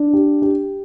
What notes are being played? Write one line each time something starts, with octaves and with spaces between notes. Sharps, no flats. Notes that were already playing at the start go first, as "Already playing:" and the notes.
Already playing: D4
G4
G4